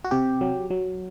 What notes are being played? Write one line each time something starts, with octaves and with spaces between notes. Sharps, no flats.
F#4
C3 G4
F#3
F#3